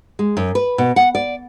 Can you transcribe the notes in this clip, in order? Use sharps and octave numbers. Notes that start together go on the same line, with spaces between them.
G#3
F#2
B4
B2
F#5
D5